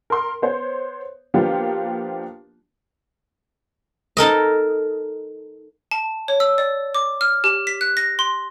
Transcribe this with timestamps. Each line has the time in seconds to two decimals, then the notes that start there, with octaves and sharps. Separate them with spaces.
0.10 A#4 C6
0.42 B3 C5 C#5
1.34 F3 A#3 B3 D4 F4 G4
4.17 D#4 A4 A#4 D#5
5.91 A5
6.28 C#5
6.40 E6
6.58 D5
6.95 D6
7.21 F6
7.44 G4
7.67 B6
7.81 F#6
7.97 A#6
8.19 C6